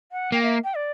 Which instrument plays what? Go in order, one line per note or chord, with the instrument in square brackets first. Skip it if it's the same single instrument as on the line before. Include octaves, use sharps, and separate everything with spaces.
[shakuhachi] F#5
[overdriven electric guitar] A#3 [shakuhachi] G5
[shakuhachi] E5
G5
D5